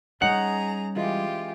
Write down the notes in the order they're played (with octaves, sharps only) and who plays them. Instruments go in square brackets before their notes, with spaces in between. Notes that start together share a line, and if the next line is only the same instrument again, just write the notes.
[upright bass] G3 [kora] C#4 D#4 [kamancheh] G#4 A#5 [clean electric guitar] F#5
[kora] E3 G#3 [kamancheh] F4 G4